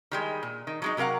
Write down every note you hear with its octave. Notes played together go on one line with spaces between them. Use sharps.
D#3 G3 G#3
A#2
D#3
F#3 G#3 D#4
C3 F#3 A#4 F5 F#5